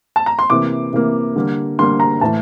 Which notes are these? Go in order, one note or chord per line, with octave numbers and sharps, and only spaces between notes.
A5
A#5
C6
C3 E3 A#3 D6
C3 E3 A#3
D3 G3 A#3
D3 G3 A#3 C6
A#5
A2 E3 A3 A5